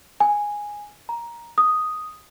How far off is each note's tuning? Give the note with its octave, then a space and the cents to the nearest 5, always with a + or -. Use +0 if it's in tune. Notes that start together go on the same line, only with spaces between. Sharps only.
G#5 -5
A#5 +10
D#6 +0